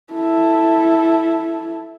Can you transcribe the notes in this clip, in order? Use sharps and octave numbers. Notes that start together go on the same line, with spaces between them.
E4 A4